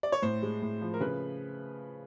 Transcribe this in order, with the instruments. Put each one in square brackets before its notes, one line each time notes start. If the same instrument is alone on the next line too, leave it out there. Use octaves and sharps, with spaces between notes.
[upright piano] D5
C#5
A2 C5
G#3
A2
F3
A#4
C#3 B4